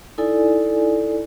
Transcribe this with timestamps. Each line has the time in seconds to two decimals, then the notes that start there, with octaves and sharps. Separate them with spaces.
0.18 D#4 E4 A4 D5 G#5